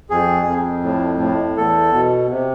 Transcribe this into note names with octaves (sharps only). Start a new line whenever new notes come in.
F2 G#4
F2
A2
A2
E2 A4
B2
C3